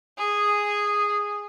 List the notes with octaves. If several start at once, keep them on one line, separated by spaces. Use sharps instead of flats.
G#4